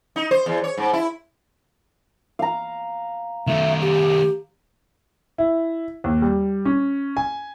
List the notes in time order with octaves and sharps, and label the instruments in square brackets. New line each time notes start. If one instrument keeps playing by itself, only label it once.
[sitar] D#4
C5
E2
C#5
G#2
E4
[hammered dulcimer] F5 A#5
[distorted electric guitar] D#3 A3 [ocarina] E5
[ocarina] G4
[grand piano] E4
D#2
G3
C#4
G#5